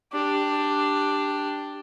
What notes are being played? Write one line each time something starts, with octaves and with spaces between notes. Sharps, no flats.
D4 G4